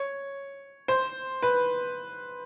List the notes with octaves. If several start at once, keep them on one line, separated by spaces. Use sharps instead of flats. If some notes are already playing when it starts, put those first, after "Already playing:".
Already playing: C#5
C5
B4